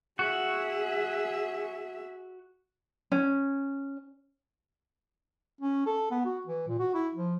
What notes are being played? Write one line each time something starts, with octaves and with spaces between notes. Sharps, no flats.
F#4 G#4 E5
C#4
C#4
A4
B3
F#4
E3
A#2
F#4
E4
F3